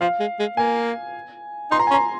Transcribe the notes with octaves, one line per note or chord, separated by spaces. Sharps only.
F3 F5
G#3
G#3
A#3 G#5
D#4 C6
A#5
G#5
C#4
A#5